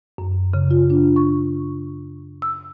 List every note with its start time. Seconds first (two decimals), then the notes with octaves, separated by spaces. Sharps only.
0.18 F#2
0.54 C#3
0.71 F4
0.90 D4
1.16 C#6
2.42 E6